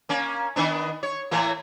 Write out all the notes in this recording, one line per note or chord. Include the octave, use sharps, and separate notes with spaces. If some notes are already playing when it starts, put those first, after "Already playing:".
A#3 C#4
D#3 B3 D4
C#5
A2 E3 A#3